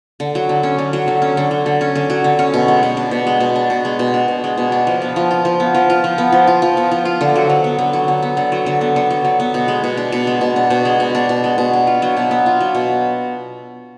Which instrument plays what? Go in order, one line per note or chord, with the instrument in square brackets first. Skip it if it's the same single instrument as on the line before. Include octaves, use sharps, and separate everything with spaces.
[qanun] D3
F#3
D3
C#4
D3
F#3
D3
C#4
D3
F#3
D3
C#4
D3
F#3
D3
C#4
B2
G#3
B2
D4
B2
G#3
B2
D4
B2
G#3
B2
D4
B2
G#3
B2
D4
F3
B3
F3
F4
F3
B3
F3
F4
F3
B3
F3
F4
F3
B3
F3
F4
D3
F#3
D3
B3
D3
F#3
D3
B3
D3
F#3
D3
B3
D3
F#3
D3
B3
B2
G#3
B2
D4
B2
G#3
B2
D4
B2
G#3
B2
D4
B2
G#3
B2
D4
F4
F#3
B2
B3
F4
F#3
B2